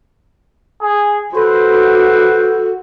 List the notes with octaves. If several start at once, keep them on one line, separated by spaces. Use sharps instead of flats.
G#4
F#4 A4 B4 C5